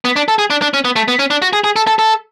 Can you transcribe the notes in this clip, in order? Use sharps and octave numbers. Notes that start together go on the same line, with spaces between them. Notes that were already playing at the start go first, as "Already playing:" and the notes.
B3
D4
A4
G#4
D4
D4
C#4
B3
A3
B3
C#4
D4
F#4
G#4
G#4
A4
A4
A4